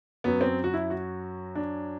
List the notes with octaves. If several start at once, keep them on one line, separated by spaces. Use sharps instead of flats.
F#2 F#3 B3
C4
F#4
E4
F#4
D4